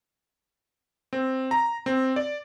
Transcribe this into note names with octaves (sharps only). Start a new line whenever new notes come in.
C4
A#5
C4
D5